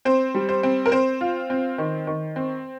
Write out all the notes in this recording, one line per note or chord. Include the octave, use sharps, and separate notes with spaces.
C4 C5
G3
C5
C4
A#4
C4 C5
F4
C4
D#3
D#3
C4